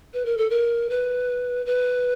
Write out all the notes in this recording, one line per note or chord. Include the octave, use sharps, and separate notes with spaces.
B4
A#4
A4
A#4
B4
B4